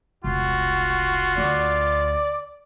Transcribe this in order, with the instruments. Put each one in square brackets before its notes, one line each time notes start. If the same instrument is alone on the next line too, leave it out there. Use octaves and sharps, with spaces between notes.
[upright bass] E1 C2 [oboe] F4 [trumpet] F#4
[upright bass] D2 [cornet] D5